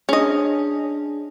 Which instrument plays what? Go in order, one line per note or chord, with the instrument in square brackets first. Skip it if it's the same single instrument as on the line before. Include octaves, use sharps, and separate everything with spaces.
[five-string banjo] C#4 D#5 [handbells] D4 G#4